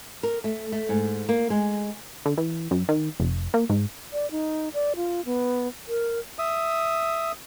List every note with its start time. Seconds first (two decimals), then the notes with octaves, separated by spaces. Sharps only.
0.23 A#4
0.44 A3
0.72 A3
0.89 G#2
1.29 A#3
1.50 G#3
2.25 D3
2.38 E3
2.71 F#2
2.89 D#3
3.20 F1
3.54 A#3
3.70 G#2
4.13 D5
4.31 D#4
4.74 D5
4.96 F4
5.25 B3
5.88 A#4
6.39 E5 D#6